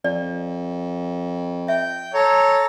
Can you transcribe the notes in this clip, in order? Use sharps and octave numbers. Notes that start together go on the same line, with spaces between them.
F2 D5
E5 G5
A4 C#5 A#5